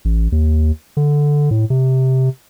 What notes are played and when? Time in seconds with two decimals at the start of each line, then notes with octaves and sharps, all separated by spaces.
0.05 A1
0.32 D#2
0.97 D3
1.51 A2
1.70 C3